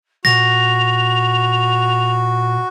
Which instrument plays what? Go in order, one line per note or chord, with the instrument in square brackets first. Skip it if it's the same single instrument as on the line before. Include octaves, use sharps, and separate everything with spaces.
[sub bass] A#2 [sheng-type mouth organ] F#4 [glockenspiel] A#6 [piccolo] F7